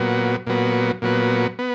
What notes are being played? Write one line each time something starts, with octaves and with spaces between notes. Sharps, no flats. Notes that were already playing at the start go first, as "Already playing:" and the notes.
Already playing: A#2 F#3 B3
A#2 F#3 B3
A#2 F#3 B3
B3